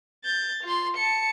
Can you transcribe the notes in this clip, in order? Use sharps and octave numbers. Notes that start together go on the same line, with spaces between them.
G6 A6
F4 C6
A5 C#7